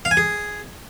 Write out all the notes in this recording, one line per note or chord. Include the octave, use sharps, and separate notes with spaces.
F5
G#5
G#4